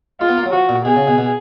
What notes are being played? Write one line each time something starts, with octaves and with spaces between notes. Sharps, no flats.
G#3 F4
B3
A#3
F#3
F3 F#4
A#2
B2 G#4
C#3
B2
B2